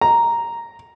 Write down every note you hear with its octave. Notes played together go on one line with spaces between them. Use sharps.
A#5